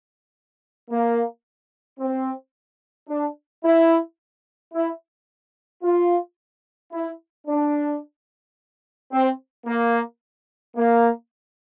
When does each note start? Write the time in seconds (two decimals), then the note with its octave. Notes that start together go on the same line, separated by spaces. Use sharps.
0.90 A#3
1.99 C4
3.09 D4
3.64 E4
4.73 E4
5.83 F4
6.92 E4
7.47 D4
9.12 C4
9.66 A#3
10.76 A#3